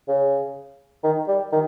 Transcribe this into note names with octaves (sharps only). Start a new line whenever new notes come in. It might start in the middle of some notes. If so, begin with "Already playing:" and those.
C#3
D#3
G3
D#3